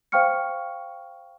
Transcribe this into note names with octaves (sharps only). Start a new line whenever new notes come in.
C5 F5 G5 C#6 F6 C#7